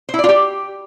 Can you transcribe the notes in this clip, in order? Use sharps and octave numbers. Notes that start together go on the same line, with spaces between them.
C5
E4
D5
F4
G4